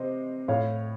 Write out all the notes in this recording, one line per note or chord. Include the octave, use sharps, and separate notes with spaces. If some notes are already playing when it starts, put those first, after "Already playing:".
Already playing: C3 C5 D#5
A2 C#5 F5